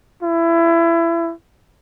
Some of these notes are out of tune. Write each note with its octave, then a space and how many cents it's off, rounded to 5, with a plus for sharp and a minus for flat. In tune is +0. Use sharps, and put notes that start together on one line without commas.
E4 +25